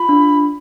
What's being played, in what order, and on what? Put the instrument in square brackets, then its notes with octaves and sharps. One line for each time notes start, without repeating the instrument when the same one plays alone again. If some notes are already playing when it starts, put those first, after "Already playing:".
Already playing: [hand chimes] F4 [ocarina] B5
[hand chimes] D4